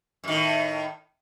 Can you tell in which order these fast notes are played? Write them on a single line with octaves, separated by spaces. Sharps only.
F#2 D#3 A2